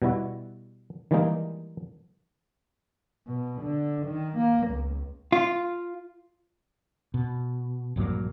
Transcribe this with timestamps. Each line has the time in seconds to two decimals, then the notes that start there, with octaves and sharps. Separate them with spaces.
0.02 B2 G3 E4 F#4
1.11 D#3 E3 G3 G#3 A#3 D#4
3.27 B2
3.62 D3
4.07 D#3
4.38 A#3
4.68 C#2
5.32 F4
7.14 B2
7.96 A#1 G2 F#3 A#3